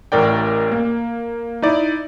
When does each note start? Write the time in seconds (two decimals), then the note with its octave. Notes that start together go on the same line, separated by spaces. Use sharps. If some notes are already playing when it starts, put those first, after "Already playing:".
0.12 A1 A2 A#4 D5 G5
0.72 A#3
1.62 D#4 E4 D5